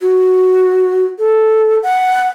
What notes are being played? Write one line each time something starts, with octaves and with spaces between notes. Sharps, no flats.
F#4
A4
F#5